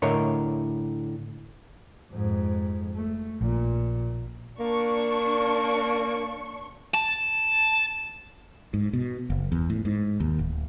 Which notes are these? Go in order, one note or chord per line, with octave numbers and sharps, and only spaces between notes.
A2 D3 A3 A#4 C#5 D#5
F2 G#2
A3
A#1 A#2
A#3 D4 C#6
A5
G#2
B2
F#1
E2
A2
G#2
D#2
D1